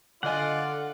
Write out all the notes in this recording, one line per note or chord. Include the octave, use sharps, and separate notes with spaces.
D3 D4 F4 D5 D#5 F#5 G#5